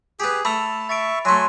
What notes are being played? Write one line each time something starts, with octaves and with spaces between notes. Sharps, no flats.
B3 G4 G#4
A3 A5 B5 E6 F7
E5 C#6 A6 D7
F#3 A3 G#5 C6